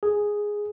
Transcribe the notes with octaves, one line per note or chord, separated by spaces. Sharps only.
G#4